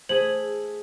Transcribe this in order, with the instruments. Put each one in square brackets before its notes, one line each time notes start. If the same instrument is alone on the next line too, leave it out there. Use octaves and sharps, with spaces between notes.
[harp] A3 G#4 [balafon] C5 [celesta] F#7